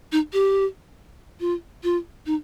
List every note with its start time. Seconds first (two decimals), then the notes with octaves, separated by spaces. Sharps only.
0.12 D#4
0.33 G4
1.40 F4
1.84 F4
2.26 D#4